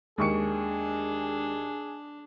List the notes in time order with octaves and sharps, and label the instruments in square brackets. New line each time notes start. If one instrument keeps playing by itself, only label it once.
[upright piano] D#2 C#6 C#7 [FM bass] G#3 [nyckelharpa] D4 [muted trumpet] G#4